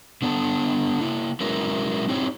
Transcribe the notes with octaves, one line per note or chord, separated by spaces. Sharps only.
D3 B3 D4 A4 G5 A5
A#3 E4
F#3 G#3 C#4 E4 A#4 B4
C4 D#4 E4 G4 C5 C#5